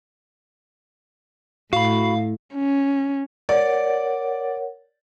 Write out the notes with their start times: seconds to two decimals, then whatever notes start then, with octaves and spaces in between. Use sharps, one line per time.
1.73 A2 F#4 F5 B5
2.55 C#4
3.49 A#4 C#5 D5 F#5